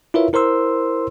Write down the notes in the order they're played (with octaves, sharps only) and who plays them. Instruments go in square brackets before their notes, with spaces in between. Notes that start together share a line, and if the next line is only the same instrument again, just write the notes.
[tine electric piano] E4 F4 A#4 B4 C#5 E5
E4 A#4 C5 C6 E6